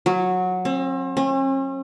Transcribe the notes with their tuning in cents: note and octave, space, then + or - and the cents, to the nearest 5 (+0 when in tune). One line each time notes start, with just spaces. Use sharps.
F#3 -15
C4 +40
C#4 -45